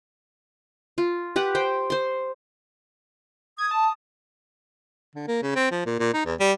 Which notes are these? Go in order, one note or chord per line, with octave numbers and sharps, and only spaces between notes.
F4
G4 B4 F#5
C5 G5
C5 C6
D#6 G#6
A5
D3
A#3
C#3
C4
F3
A#2
A#2
D#4
E2
G3